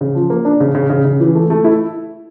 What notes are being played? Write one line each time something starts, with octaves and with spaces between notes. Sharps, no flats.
C#3
F3
A#3
D4
C#3
C#3
C#3
C#3
E3
A3
A3
E4